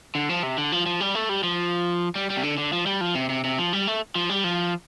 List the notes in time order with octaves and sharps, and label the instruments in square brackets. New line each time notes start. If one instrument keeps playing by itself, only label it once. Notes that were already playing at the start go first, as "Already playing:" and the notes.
[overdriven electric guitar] D3
F3
C3
D3
F3
F3
G3
A3
G3
F3
G3
G3
C3
D3
D3
F3
G3
F3
C3
C3
C3
F3
G3
A3
F3
G3
F3